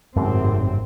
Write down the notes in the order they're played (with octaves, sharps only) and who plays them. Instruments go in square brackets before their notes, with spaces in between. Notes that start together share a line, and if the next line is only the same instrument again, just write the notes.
[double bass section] G#1 C4 [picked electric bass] F#2 A2 C3